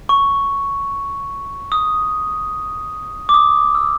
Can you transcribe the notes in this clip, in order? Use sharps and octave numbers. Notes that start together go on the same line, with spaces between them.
C#6
D#6
D6
D#6
E6